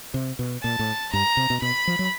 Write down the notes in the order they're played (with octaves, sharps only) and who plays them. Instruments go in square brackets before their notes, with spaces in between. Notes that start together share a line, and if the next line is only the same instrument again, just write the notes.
[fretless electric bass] C3
B2
[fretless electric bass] A#2 [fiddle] A5
[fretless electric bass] A2
[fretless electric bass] G2 [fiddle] A#5
[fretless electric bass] C3
B2
[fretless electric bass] B2 [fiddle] B5
[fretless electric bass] F3
F#3